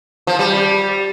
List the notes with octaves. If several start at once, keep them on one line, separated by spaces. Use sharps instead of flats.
F3
G3